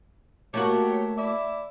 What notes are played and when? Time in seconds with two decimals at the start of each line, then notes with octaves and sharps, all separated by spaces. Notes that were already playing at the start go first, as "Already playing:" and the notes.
0.54 A3 A#3 F#4 G4 C#5
1.18 E4 D5 E5